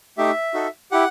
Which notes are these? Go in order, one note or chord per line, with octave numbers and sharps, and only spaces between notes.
A3 D#4 G4 E5
D#4 F#4 A4
E4 G4 F#5